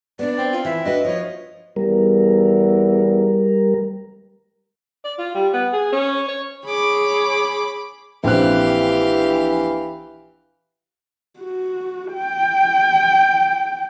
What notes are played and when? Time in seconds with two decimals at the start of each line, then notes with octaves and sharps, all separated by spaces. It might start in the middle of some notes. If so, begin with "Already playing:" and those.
0.19 B3 D4 D5
0.38 C4
0.53 F4
0.65 E3 E5
0.85 D4 F#4 B4 D#5
1.05 F3 F4 C#5
1.76 E2 G3 A#4
5.04 D5
5.18 F4
5.34 G3
5.53 B3
5.73 G#4
5.92 C#4
6.28 C#5
6.65 G#4 C#5 B5 D6
8.24 A#1 E3 C4 G4 F5 F#6
11.39 F#4
12.15 G5